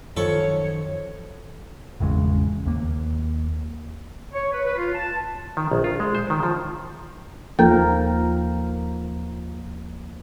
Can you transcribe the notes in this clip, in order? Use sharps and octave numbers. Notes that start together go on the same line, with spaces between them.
F#2 D#3 F3 A4 C#5 B5 C#6
G#1 E2 C#3 G#3
D#2 A#3
C#5
B4
B4
F4
A5
D#3
A#1
F4
G#3
C5
D#3
F3
D#2 F3 A#3 A4 A#4 G6